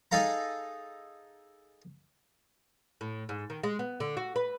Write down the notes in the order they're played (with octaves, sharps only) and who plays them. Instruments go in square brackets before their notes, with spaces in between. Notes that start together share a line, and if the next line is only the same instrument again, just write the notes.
[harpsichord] D#4 G#4 A4 F5 A#5
[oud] A2
G#2
D#3
G#3
B3
D3
F#4
B4